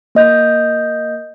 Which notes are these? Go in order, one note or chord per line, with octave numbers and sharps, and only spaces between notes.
A#3 D#5 G6